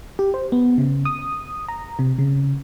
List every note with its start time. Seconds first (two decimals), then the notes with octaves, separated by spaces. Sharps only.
0.19 G4
0.34 C5
0.52 B3
0.78 C#3
1.05 D#6
1.69 A#5
1.99 C3
2.19 C#3